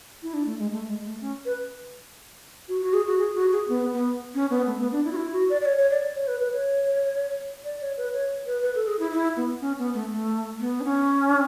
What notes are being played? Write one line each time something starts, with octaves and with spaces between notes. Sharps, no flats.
E4
D4
A3
G#3
A3
G#3
A3
C#4
B4
F#4
F#4
G#4
F#4
G#4
F#4
G#4
B3
B3
C#4
B3
A3
B3
D4
E4
F#4
E4
F#4
D5
D5
C#5
C#5
D5
C#5
B4
B4
C#5
D5
C#5
B4
C#5
B4
B4
A4
G#4
E4
E4
B3
C#4
B3
A3
A3
B3
D4
C#4